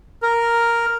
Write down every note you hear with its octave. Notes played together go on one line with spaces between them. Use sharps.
A#4